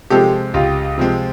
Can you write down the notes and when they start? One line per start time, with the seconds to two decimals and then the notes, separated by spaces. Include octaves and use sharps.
0.10 C3 F3 G#3 C4 G4 A4
0.54 C#2 F4 G4
0.98 C3 F3 G#3 C4